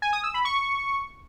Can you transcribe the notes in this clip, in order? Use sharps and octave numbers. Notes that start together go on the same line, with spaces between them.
G#5
D#6
E6
B5
C#6